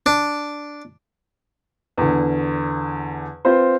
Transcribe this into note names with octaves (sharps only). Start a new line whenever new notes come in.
D4
E2 D3
C4 F4 B4 C5